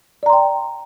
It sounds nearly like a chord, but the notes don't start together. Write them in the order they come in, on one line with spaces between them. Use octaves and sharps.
D5 A#5 C6 G5